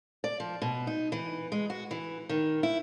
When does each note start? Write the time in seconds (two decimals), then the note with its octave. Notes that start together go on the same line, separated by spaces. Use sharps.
0.24 D5
0.40 F3
0.62 B2
0.87 D#4
1.12 E3
1.52 G#3
1.70 F#4
1.91 E3
2.29 D#3
2.63 E4